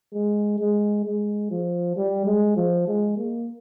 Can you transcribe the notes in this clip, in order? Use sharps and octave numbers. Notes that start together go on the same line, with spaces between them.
G#3
G#3
G#3
F3
G3
G#3
F3
G#3
A#3